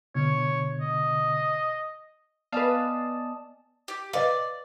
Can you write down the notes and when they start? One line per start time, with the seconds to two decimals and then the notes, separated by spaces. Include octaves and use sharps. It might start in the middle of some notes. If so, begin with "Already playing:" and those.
0.15 B2 D3 C#5
0.81 D#5
2.52 B3 B4 D5 D#5 F5 G#5 A5 D#6
3.88 G4
4.13 B4 D5 D#5 F5